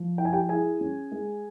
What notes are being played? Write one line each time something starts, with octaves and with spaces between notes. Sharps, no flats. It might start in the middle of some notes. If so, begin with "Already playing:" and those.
Already playing: F3
E4 G5
G#5
G4 G5
E4 G#4 G#5
C#4
G#3